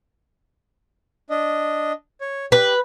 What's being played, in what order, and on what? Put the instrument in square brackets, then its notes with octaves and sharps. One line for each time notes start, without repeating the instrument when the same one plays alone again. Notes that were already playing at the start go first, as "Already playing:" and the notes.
[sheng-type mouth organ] D4 D#5
C#5
[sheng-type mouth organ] G4 [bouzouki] B4